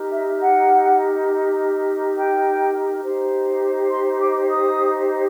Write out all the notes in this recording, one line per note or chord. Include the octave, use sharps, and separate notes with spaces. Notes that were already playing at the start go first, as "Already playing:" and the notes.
Already playing: D#4 G4 A#4
E5
F#5
G5
D#4 G4 C5
C6
D6
D#6